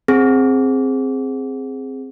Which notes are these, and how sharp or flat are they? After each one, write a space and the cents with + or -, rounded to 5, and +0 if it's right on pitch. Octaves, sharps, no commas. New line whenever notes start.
C4 +5 G#4 +0